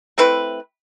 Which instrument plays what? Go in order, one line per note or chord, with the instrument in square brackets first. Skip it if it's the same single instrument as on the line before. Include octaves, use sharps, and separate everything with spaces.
[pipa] A3 C4 E4 B4